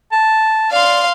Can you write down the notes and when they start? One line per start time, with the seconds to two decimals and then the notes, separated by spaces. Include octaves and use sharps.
0.12 A5
0.72 D5 F5 C6